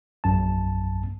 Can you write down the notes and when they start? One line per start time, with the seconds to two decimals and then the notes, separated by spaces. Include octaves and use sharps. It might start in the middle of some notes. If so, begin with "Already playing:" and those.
0.24 A#1 F#2 A5